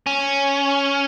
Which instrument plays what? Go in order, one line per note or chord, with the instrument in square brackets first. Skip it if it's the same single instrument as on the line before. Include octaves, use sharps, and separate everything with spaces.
[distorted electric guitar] C#4